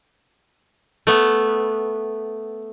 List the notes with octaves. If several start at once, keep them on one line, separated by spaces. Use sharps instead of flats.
A3 B3